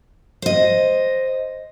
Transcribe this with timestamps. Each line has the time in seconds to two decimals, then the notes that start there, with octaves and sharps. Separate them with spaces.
0.42 C5 D#5